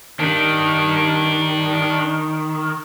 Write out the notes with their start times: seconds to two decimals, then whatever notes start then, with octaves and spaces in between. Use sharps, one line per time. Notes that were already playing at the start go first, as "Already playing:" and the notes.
0.20 D#3 D4 G4